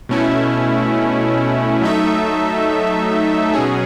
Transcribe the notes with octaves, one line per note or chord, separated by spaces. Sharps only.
B2 A3 C#4 E4
F#3 A3 D#4 A4 E5
B2 F#3 C#4 G#4